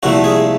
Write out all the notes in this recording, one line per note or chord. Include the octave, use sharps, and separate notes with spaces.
C2 A#2 F3 A3 F#4
G#4